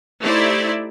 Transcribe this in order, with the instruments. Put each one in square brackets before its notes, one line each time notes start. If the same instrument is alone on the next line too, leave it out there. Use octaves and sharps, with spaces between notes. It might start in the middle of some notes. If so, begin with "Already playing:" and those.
[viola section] A3 D#4 E4 G4 C5 D5